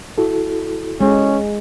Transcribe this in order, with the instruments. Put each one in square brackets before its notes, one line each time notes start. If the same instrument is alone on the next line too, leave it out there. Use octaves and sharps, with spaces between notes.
[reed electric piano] E4 F#4 A4
[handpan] G#3 [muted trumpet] C#4